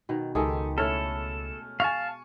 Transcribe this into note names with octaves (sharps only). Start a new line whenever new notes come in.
B2 D#3
C#2 D#3 G#3 G4 A4 G#5 D#6
A3 C#4 E4 A4 C#5 F6
F5 G#5 A5 C#6